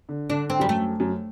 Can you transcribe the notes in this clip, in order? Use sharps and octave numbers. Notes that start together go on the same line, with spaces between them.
D3
D3 D4
C4
F#2 G3
A3
F#2